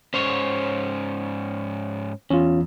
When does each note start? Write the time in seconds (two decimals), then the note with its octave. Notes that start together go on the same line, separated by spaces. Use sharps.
0.14 G#2 C#4 C5 C#5
2.30 E2 C#4 F4